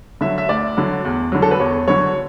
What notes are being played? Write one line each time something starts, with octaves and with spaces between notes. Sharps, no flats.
D3 F#3 E5
E5
D2 D5
D3 F#3
E2
D3 F#3
A4
B4
E2 C#5
D3 F#3 C#5